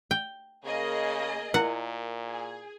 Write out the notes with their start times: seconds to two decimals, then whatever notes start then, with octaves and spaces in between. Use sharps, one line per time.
0.11 G5
0.64 C#3 A#3 G#4 D#5
1.54 A#2 E4 A#4 F#5
2.26 G#4